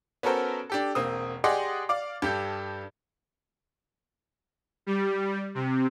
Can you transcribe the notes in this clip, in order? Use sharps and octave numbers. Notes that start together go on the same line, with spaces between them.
B3 C#4 F#4 A4 A#4 C5
D4 G4 A4
E1 A#3 C4 D#6
G4 G#4 D5 D#5 F#5 C6
D5 F5 D6
G2 G4 A4 G6
G3
C3